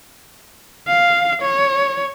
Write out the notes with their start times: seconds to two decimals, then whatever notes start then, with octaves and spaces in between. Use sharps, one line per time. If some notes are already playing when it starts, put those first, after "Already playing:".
0.87 F5
1.41 C#5